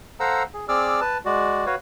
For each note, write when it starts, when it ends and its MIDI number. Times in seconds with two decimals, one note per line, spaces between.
0.20 0.43 69
0.20 0.43 72
0.20 0.43 77
0.20 0.43 78
0.20 0.43 82
0.20 0.43 88
0.54 0.65 68
0.68 1.00 60
0.68 1.00 68
0.68 1.00 74
0.68 1.00 86
0.68 1.00 88
0.68 1.00 89
1.01 1.18 71
1.01 1.18 81
1.25 1.66 56
1.25 1.66 66
1.25 1.66 74
1.66 1.75 66
1.66 1.75 71
1.66 1.75 73
1.66 1.75 77